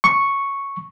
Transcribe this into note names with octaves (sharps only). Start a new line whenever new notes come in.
C#6